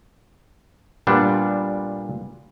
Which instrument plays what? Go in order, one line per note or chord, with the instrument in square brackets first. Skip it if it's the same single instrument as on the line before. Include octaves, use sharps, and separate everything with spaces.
[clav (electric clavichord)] A#2 G3 B3 D4 F4